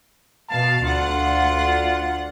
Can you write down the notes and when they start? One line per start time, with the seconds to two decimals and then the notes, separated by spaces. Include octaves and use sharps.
0.49 B2 F5 A5
0.82 D2 F4 F#5